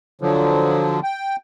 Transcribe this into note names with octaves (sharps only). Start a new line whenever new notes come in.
D3 F3 F#3
G5